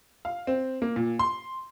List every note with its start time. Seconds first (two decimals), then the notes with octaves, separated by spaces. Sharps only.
0.25 F5
0.47 C4
0.82 A#3
0.96 A#2
1.19 C6